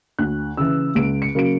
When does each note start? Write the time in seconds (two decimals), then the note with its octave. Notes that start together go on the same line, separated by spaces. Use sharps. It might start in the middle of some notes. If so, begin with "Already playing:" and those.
0.19 D2 F#6
0.57 C#3 E3 E6
0.95 C#2 D7
1.22 C#7
1.35 C#3 F#3 A#3 D7